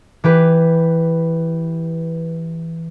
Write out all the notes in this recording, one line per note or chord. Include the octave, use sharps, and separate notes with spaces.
E3 G4 B4